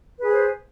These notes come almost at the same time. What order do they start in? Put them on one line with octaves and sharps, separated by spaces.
B4 G#4 G#5 C5